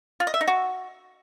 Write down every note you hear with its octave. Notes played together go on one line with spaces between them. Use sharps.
F4
D#5
E5
D#4
F#4